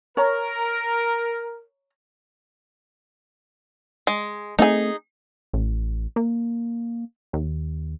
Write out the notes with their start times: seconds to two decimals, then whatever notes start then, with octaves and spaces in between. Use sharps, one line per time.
0.17 A#4 C#5 A#5
4.07 G#3
4.59 A3 C4 D#4 G#4
5.53 A1
6.16 A#3
7.33 D#2